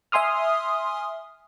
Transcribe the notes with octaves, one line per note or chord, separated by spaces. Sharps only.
E5 G#5 C6 D#6 F6